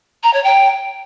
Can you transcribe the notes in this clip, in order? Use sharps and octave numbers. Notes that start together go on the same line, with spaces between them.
A#5
C#5
G5